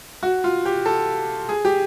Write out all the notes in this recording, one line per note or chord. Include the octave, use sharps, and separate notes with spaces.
F#4
F4
G4
A4
G#4
G4